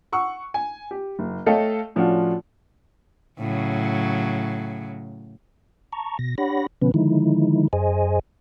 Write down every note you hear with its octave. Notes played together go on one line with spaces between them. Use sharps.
F#5 C#6 E6
G#5
G4
F#1
A3 A4 C#5 D#5 F5 G5
A2 F3 C#4 D4 F4 F#4
A2 C#3 F#3
A5 A#5 C#6
B2 A#6
D4 G4 C#5 F#5 B5 A#6
B2 D3 F3 B3 C#4 B4
D3 D#3 F3 G#3 D#4 E4
F#2 G#4 C5 D#5 G#5